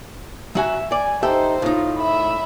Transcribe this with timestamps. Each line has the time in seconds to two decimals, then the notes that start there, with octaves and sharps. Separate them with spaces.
0.55 F#3 F#4 E5 G#5
0.92 D5 G#5
1.23 D#4 G4 A4 C5 E5
1.62 A2 D#4 F4
1.98 E5 B5